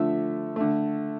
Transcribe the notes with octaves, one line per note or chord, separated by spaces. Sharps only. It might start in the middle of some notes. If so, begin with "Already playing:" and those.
Already playing: D3 F3 A3 E5
D3 A3